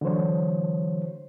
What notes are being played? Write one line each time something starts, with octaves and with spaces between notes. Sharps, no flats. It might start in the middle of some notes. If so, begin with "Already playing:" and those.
D3 E3 F#3 G#3 C5 C#5